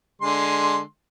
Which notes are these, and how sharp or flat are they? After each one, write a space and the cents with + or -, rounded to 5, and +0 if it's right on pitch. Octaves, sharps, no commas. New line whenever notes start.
D3 +0 G#3 +0 C6 +0